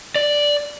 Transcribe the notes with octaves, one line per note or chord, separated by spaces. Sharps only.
D5